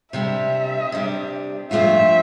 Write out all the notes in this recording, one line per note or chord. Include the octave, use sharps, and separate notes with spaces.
C3 G3 D4 E5
C3 G3 D4
G2 F3 A3 C4 F4 E5